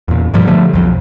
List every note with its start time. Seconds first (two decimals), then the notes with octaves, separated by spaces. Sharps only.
0.08 E2 A#2
0.34 G2 A#2 F3 G3
0.47 D3 F3 G3 A3
0.73 B1 F2